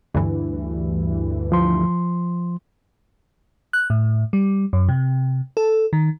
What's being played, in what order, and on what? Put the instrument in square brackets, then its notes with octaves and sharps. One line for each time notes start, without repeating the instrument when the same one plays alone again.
[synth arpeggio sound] D2 G2 E3
[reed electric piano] F3 C6
[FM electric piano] F#6
A2
G3
F#2
C3
A4
D#3